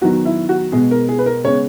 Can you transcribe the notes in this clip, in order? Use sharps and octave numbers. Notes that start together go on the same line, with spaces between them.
D#3 F#3 B3 F#4
E4
F#4
B2 G#3 B3 G#4
A#4
G#4
B4
A#4
C#3 G#3 B3 C#5